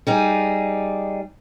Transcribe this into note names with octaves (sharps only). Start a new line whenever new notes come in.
G3 D#4 G#4